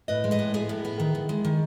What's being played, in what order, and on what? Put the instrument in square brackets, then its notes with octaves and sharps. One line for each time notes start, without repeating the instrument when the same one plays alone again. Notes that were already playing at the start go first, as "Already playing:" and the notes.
[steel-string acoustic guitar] A2 B4 D#5
G#3
B4 D#5
A2
B3 E4 G#4
A2
B3
D#3
D#3
G#3
D#3